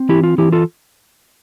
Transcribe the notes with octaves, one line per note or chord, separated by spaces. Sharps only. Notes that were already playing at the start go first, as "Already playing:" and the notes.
Already playing: C4
E3 E4 G4
F4
E3 E4 G4
F4 A4